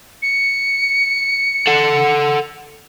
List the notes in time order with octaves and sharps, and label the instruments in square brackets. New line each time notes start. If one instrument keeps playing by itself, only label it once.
[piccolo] C#7
[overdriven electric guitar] A4 F#5